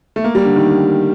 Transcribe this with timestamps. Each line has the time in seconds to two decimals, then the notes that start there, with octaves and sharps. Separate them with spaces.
0.16 A3
0.24 A#3
0.35 G3
0.45 D3
0.56 D#3